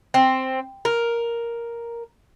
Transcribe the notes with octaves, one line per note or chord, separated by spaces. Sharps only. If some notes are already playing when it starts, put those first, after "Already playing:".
C4
A#4